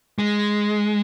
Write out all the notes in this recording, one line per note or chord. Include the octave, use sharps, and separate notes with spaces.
G#3